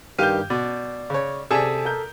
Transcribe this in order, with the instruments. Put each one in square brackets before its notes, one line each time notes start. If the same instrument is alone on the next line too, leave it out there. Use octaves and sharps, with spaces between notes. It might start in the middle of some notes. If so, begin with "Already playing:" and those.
[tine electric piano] G2 D#3 G3 [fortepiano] G4 F5 [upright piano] G6 D#7
[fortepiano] B2 [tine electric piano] D5
[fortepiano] C#3 C#5
[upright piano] C3 G#5 E7 [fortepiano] G#4 D5 [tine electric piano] A4 B6
[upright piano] A#4 G6